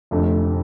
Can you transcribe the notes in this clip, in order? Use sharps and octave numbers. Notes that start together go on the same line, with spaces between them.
F1 F2 D3 A3